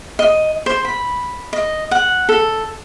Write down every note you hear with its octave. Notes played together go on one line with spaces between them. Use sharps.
D#5
C5
B5
D#5
F#5
A4